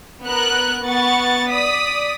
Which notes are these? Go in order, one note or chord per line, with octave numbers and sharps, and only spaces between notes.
B3 A#4 F#6
B3 F#5 C#6 A6
D5 D#6 B6